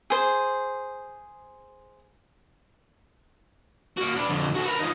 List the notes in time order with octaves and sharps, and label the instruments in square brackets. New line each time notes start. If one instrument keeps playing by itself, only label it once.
[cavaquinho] G#4 C5
[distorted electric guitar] A#3 F#4
D4 B4
F2 D3
F#4 A4
A#4 B4
F3 D#4